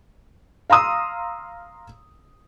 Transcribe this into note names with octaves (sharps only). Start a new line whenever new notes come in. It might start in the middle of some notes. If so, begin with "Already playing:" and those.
F5 A#5 C6 D#6 E6